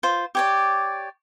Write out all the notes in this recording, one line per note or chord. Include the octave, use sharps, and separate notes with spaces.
F4 C5
G4 C#5 D5